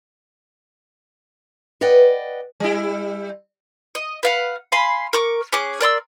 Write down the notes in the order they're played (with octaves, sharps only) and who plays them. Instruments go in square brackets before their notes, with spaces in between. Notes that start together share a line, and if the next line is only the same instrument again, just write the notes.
[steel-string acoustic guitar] B4 D5 D#5 F#5 G5
[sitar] G3 E4
[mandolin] D#5
B4 F5 F#5
F5 G#5 B5 C6
A#4 C#6 D6
C#4 G#4 D6 F#6
A#4 D5 C6 E6